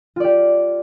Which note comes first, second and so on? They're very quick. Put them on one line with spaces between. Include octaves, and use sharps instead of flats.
F4 D5 G4